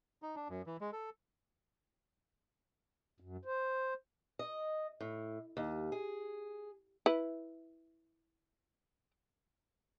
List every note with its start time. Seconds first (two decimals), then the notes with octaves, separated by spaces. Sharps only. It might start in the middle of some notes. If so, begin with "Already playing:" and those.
0.22 D#4
0.36 D4
0.49 F#2
0.67 E3
0.81 G#3
0.93 A4
3.20 F#2
3.45 C5
4.39 D#5
5.01 A2
5.57 D#2
5.92 G#4
7.06 E4 B4